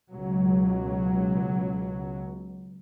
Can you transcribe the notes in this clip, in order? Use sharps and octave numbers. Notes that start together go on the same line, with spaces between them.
C#2 B2 F#3